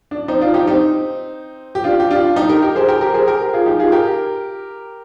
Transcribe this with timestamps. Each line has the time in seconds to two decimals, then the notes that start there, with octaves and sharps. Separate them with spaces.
0.11 D4
0.28 C4 D#4
0.41 D4 F4
0.54 D#4 G4
0.67 C4 D#4
1.75 G4
1.84 D4 F4
2.00 G4
2.11 D4 F4
2.36 D#4 G4
2.49 G4 A#4
2.62 G4 A#4
2.75 G#4 C5
2.88 G4 A#4
3.01 G4 A#4
3.14 G#4 C5
3.27 G4 A#4
3.53 F4 G#4
3.66 D#4 G4
3.79 F4 G#4
3.92 G4 A#4